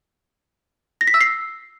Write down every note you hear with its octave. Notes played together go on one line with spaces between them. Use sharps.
A#6
B6
E6
C7